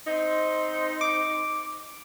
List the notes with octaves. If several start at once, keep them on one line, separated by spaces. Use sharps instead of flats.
C4 D#4
D6